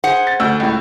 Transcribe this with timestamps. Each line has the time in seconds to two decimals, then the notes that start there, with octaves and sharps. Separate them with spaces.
0.04 G#4 C5 F#5
0.27 A6
0.40 D2 E6 G6
0.60 C#2 A2